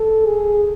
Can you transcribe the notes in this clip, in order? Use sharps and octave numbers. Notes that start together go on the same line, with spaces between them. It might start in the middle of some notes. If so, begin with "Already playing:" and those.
Already playing: A4
G#4